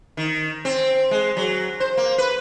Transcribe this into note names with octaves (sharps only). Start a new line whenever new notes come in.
D#3
C4
G#3
F#3
C5
A#3
B4